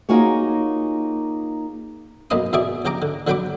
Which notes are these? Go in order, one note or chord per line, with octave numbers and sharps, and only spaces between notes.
A#3 D#4 F4 F#4 G#4 C#5
B1 F#2 A#3 D#4 B5 D#6
E2 B2 G#4 D5 E5 D6
A#1 C#3 G4 A#5 D6
D3
D3 F#3 C#5 G5 B5 D6